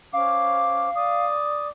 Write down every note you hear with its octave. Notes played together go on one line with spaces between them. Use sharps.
C#4 C5 F5 D6
D5 D6 D#6